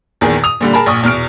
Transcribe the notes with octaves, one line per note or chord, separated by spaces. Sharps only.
A#1 E2 D#3 G#4
D#6 F7
A#2 D3 G3
G#4 A#4 A5 B5
A#1 A#2 C#6 D#6
E2 B2 F6 D7